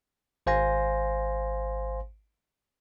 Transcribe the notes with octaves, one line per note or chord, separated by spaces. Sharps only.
G#1 C5 F5 G#5 C6 A#6